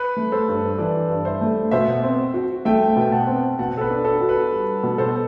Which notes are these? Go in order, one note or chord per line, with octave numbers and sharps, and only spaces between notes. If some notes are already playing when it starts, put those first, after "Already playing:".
Already playing: B4
A3
A4 C5
G2
E3 B4 D5
G2
C5 E5
A3
B2 C5 E5
C4
F#4
A3 E5 G5
B2 G5
F#5 A5
C4
B2 F#5 A5
A4
B4
D4
A4
F#4
B4
G3
B2
A4 C5